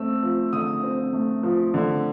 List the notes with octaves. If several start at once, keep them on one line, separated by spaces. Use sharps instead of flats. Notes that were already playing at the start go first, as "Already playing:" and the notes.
Already playing: A3 C4 E6
F3
D3 D#6
C4
A3
F3
D3